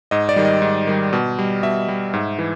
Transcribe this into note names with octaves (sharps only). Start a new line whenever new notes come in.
G#2 D#5
D5
D#3 G3
D#5
G#2
D#3 G3
B2
G3
B2 E5
G3
G#2
E3